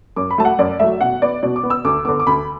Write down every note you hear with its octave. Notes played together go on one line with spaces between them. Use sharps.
F#2 D6
B5
F#3 A3 A5
F#5
F#2 D5
F#3 A3 E5
B2 F#5
B3 D5
B2 D5
D6
B3
E6
D2 D6
D3 B3 D6
D6
D2 B5